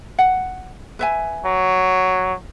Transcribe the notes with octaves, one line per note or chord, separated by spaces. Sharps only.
F#5
B4 E5 G#5
F#3